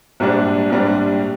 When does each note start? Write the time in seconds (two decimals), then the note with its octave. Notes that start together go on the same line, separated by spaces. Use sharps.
0.20 A#1 G#2 G3 D4
0.70 A#1 G#2 G3 D4